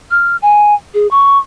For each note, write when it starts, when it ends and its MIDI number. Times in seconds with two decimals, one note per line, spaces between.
0.11 0.37 89
0.42 0.75 80
0.94 1.07 68
1.11 1.38 85